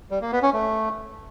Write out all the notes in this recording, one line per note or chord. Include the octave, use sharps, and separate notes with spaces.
G3
A#3
B3
C#4
A3